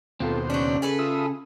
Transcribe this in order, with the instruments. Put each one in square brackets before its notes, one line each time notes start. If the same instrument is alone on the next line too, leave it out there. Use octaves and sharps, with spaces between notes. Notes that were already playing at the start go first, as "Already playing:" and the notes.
[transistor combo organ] D#2 B2 C5 [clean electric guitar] C4 F4 A4
[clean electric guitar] C#3 [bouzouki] F#3 D4
[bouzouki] G#4 A4 B4
[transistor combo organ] F4 E5 D#6